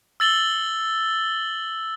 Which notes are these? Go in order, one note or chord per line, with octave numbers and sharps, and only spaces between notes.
E6 A6 F#7 G7